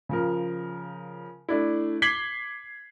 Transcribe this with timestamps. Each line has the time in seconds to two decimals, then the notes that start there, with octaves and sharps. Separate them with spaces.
0.09 C#3 F3 A#4
1.49 A3 D4 E4
2.02 D6 G#6 B6 C7 F#7 G7